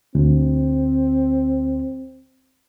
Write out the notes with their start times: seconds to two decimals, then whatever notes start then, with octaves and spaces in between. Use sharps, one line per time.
0.15 D2 C4